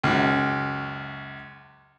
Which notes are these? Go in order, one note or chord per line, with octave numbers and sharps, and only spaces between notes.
C#2 F#2